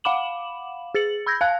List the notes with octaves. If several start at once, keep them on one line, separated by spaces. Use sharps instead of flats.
F5 F#5 B5 D6 E7 F#7
G#4 A6 C#7 F#7
B5 E6 G6 G#6 A#6
F5 A5 F#6 G#6